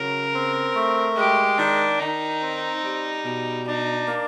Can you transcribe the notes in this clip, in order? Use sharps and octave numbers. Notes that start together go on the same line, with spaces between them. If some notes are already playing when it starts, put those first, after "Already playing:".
Already playing: C#3 F#3 A#4
C4
A3
G#3 G4
D#3 D4
D#3 D#4
C4
G3
B2
D4 D#4
A#3